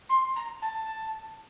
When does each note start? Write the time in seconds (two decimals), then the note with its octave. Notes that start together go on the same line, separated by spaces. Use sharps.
0.09 C6
0.35 A#5
0.61 A5